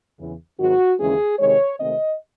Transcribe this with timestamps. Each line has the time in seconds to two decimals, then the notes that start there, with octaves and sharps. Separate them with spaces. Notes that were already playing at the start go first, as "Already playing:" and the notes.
0.18 E2 C#3 E3
0.59 G#2 D#3 F#3 C4 F#4
0.99 D#2 C#3 E3 G#3 C#4 G#4
1.39 C3 D#3 G#3 C#5
1.79 C3 D#3 A3 C4 D#5